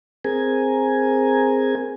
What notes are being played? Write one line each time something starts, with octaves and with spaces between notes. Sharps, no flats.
C4 G#4 A#4 G#5